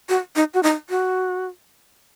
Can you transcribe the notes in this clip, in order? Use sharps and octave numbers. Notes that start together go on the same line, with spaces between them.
F#4
D#4
F#4
D#4
F#4